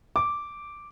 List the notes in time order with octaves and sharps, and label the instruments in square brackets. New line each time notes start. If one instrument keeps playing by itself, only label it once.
[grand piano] D6